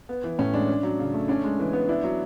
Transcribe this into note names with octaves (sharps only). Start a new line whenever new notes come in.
B3
E3
A2 C#4
G#3 D4
C#4
F#3
C#3
A3
C#4 D4
G#3
E3
B3
D4 E4
F#3